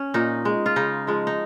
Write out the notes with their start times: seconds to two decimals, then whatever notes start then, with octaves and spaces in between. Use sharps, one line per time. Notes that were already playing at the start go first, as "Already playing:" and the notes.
Already playing: C#4
0.14 A#2 D#4
0.45 G#3
0.66 F4
0.76 C#3 D#4
1.07 F3 G#3
1.27 D#4